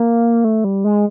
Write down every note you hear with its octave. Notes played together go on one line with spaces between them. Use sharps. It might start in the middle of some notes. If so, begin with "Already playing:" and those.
Already playing: A#3
A3
G3
G#3